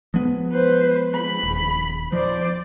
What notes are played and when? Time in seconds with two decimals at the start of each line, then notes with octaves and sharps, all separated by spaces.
0.14 F3 G#3 B3
0.52 B4 C5
1.14 B5
1.43 D#1
2.12 F3 C5 D5